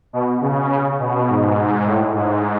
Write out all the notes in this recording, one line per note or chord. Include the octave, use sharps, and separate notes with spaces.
B2
C#3
C#3
B2
G#2
A2
G#2